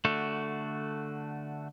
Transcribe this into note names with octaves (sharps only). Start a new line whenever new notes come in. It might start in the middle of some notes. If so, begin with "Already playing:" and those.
D3 A3 F#4